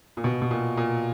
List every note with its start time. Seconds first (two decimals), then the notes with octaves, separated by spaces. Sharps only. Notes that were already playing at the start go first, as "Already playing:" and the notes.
0.17 A#2
0.24 B2
0.42 B2
0.51 A#2
0.77 A#2